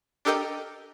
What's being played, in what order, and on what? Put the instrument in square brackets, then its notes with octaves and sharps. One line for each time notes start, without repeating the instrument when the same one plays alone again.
[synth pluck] D4 G4 A4 A#4 D#5 G5